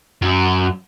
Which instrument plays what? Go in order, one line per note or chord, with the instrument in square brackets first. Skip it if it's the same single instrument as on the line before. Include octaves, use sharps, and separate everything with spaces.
[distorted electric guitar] F#2